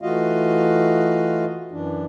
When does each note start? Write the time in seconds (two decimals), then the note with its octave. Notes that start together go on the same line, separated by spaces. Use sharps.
0.02 E3 A3 F4 F#4 D#5 F5
1.71 F#2 E3 D4